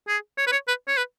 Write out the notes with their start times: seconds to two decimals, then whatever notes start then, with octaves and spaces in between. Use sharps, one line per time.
0.08 G#4
0.38 C#5
0.47 B4
0.52 C#5
0.68 B4
0.88 C#5
0.97 B4